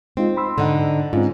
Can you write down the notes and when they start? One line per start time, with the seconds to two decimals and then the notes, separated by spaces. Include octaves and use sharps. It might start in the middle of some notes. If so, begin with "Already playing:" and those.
0.17 G#3 C4 D#4 F4
0.37 B5 C6 E6
0.58 G#2 D3 D#4 F#5
1.13 G#2 C4 C#4 F4